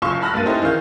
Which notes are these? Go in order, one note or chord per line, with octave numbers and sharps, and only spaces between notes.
F#1 F#2 F4 C6 C#6 E7
A5 B5 F6 F#6 A#6
G2 A3 A#3 A6 D#7
C#4 D#4 E4 G4 A4 C5
D#3 E3 G#4 F5 G6